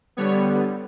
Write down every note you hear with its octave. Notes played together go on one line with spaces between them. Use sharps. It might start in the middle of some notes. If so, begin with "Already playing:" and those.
D3 G3 B3 C#5